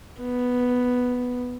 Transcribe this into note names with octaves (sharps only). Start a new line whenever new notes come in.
B3